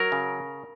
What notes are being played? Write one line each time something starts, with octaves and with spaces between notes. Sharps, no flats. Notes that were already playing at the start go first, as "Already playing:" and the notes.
Already playing: F#3 A#4
C#3